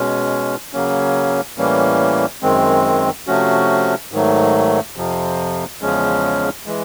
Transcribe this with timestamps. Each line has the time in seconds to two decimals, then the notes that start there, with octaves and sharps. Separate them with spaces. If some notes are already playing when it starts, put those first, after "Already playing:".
Already playing: B2 G#3 C#4
0.73 C#3 F#3 A#3 C#4
1.58 A2 E3 G3 A#3 C#4
2.42 F#2 D#3 G#3 C4
3.27 C3 F3 A3 C#4 F#4
4.12 G#2 D#3 F#3 A3
4.96 F2 C3 F3
5.81 E2 C#3 F3 G#3 C#4
6.66 E3 G#3